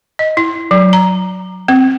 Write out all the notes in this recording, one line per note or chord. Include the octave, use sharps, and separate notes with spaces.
D#5
E4
F#3
A#5
C4